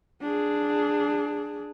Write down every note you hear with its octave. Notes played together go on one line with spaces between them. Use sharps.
D4 G#4